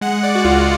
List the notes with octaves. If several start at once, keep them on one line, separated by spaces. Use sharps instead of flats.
G#3 F#5
D5
F#4
C#2 F4